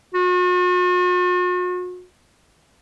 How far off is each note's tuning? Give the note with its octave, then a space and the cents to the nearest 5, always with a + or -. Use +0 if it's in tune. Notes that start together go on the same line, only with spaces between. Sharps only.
F#4 -45